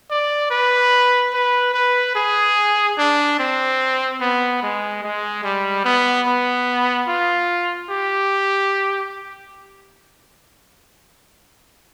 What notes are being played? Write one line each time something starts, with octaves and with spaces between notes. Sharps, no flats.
D5
B4
B4
B4
G#4
D4
C4
B3
G#3
G#3
G3
B3
B3
F4
G4